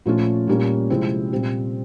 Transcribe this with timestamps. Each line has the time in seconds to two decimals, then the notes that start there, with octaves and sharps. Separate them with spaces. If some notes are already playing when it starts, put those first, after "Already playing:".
0.06 A#2 F3 A3 C#4 F4
0.47 A#2 G3 A#3 C#4
0.90 C3 F3 G#3 C4 E4
1.32 A#2 G3 C4